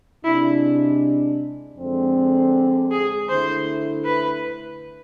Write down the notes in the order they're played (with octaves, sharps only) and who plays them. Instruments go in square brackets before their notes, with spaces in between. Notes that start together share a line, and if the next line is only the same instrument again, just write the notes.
[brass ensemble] C3 G#3 D4 [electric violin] E4
[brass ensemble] F2 D3 G#3 C4
[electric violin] G#4
[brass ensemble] D3 A3 E4 [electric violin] C5
[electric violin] B4